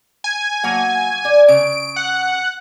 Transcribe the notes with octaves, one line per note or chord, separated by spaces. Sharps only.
G#5
F#3 A#3 F#5
D5
C#3 D7
F#5